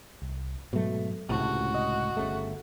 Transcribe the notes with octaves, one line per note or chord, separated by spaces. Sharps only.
C2
G#2 B2 F#3 A3
C#2 A2 C3 F#4 A5
D#5
G1 C#3 A3